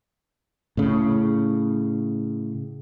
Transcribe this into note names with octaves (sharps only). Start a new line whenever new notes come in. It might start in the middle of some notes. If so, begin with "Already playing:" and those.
A2 C#3